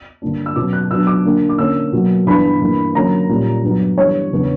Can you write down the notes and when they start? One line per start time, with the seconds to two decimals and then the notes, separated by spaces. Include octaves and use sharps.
0.22 G2 D3 A#3 D4
0.46 E6
0.56 B2 F#3 C#4 D6
0.73 F#6
0.90 B2 F#3 B3 D4 E6
1.07 D6
1.24 D3 A#3 D4
1.49 D6
1.58 D3 A#3 C#4 E6
1.92 B2 F#3 A#3
2.27 G2 E3 B3 D4 B5
2.61 G2 E3 A#3
2.95 D3 F#3 A#3 C#4 A#5
3.29 A#2 G3 C#4
3.63 G2 F#3 B3
3.97 G2 E3 G3 B3 D4 C#5
4.31 E2 C#3 E3 B3 D4